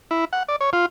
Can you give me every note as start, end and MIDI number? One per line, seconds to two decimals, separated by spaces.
0.11 0.25 64
0.33 0.43 78
0.48 0.56 74
0.61 0.70 73
0.73 0.86 65